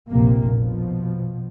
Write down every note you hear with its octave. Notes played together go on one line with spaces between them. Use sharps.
F1 A#1 C3 A#3
B2 F3